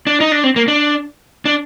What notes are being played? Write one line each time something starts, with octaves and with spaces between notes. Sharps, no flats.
D4
D#4
D4
C4
A#3
D4
D4